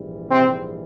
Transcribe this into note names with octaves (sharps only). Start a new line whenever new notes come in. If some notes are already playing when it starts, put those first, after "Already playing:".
Already playing: A#1 G#2 E3 G3
C3 C4